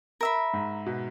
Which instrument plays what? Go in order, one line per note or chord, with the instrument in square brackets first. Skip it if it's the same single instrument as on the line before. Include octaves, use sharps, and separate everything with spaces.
[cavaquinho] A#4 E5 B5
[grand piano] G#2
B2